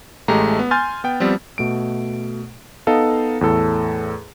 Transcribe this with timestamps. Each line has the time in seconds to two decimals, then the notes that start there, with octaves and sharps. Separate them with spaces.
0.28 A1 G#3 A3 G4 A#5
0.59 B3
0.71 G#5 C6 F6 G6 A6
1.04 B3 G5
1.20 F3 G3 B3 C4
1.58 B2 A3 D7
2.87 B3 D#4 A4 D#5 F5
3.41 E2 A2 A4